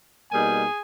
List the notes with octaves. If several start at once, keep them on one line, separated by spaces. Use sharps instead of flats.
B2 G3 A#3 D#4 G#4 G#5